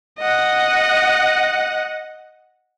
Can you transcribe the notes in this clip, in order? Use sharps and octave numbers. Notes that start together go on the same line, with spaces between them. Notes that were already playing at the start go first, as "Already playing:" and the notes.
D#5 F#5